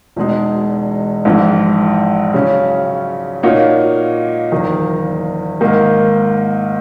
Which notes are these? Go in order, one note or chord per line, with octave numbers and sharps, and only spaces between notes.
E1 E2 B2 G#3 D#4
A#1 G#2 E3
C#3 F#3 C#4
A#2 A#3 D#4 F#4 C#5
F#1 E2 D#3
G#2 D#3 A#3 D#4